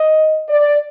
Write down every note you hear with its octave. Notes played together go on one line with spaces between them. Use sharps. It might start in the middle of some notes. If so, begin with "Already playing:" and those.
Already playing: D#5
D5